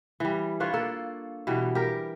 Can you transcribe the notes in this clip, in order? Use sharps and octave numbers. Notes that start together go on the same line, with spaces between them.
E3 G3
D4 F4 B4 C#5
A#3 A4
B2 E3 G3
G4 A#4